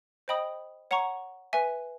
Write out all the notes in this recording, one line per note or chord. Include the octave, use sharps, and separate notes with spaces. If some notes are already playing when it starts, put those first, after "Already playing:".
C5 D#5 G5 B5 D#6
C#5 F#5 A#5 C#6
B4 E5 G#5